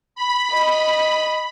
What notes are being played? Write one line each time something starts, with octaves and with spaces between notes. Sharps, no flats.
B5
D#5